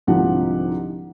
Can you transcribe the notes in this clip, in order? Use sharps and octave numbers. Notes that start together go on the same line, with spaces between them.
C2 G#2 D3 F3 G4 F#5